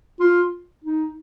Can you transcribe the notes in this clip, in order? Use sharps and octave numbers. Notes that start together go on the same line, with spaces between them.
F4
D#4